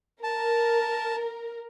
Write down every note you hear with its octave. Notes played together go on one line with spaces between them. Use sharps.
A#4 A5